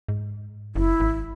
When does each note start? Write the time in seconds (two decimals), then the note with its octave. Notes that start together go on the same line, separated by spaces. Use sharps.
0.08 G#2
0.75 F#1 E4
1.00 G#1